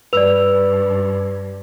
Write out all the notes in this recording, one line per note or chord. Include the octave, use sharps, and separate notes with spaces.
G2 B4 D5 E6 F7